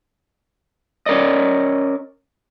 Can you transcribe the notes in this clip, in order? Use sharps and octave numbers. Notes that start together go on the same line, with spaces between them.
C#4 A#4 D5 D#5